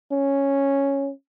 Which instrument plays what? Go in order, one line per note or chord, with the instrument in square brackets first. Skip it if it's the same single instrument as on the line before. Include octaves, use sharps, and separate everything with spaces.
[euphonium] C#4